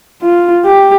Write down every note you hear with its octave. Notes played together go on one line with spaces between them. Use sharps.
F4
G4